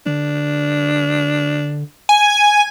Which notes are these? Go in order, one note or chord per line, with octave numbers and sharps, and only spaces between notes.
D3 D4
G#5